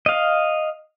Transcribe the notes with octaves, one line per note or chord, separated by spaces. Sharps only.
D#5 F5